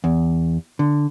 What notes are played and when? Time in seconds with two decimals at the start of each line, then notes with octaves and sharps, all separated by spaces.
0.04 E2
0.79 D3